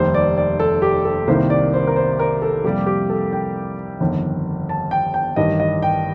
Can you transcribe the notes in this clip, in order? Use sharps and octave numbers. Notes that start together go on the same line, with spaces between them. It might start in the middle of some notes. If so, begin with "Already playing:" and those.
Already playing: F1 D#2 D#3 G3 C5
D5
D5
A4
G4
A4
C2 C3 D#3 A#3 C5
D5
C5
A#4
C5
A#4
A4
F2 C3 G3 A#3 G4
G4
A4
G5
G1 F2 D#3
A5
G5
G5
A1 G2 D#3 D#5
D#5
G5